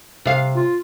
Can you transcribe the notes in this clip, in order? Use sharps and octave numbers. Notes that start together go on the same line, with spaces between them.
C3 F5
F4